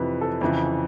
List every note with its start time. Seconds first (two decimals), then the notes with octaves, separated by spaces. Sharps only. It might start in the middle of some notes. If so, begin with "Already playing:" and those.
Already playing: F2 C3 E3 B4
0.21 A4
0.41 F2 C#3 E3